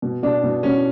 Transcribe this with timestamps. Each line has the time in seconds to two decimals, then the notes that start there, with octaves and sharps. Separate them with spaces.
0.02 B2
0.23 B2 D4
0.44 B2
0.63 B2 C#4